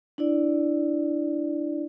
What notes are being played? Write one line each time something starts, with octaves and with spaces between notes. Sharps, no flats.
D4 E4 D5